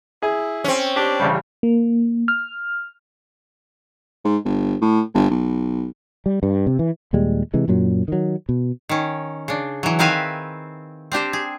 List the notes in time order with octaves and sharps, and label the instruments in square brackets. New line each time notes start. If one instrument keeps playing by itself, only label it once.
[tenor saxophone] E4 [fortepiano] G#4
[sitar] C4 C#4
[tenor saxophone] D4 [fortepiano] G4
[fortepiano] A1 C#3 G3
[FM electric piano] A#3
F6
[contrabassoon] G#2
G1
A2
G1
B1
[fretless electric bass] G3
G2
C3
E3
D#2 A#2 G3 G#3
C3 E3 G#3
F#2 A#2 F#3
D#3 F#3
B2
[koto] D#3 C#4
C#3 D4
E3 F#3
D#3 C4 B4 E5 F5 G#5
C4 D4 G4 C5
G#4